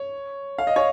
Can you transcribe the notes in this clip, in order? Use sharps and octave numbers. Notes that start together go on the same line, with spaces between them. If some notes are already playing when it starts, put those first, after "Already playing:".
Already playing: C#5
F5
D#5
C#5